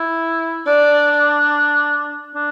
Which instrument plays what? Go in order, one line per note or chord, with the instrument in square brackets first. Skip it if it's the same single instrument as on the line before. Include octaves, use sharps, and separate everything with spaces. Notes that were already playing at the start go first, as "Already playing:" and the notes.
Already playing: [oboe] E4
[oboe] D4 [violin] D5
[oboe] D4